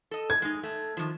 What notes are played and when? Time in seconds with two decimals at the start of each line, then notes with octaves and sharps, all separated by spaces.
0.11 A4 D#5
0.30 G#6
0.42 G#3 D#4
0.63 A3
0.97 D#3 F3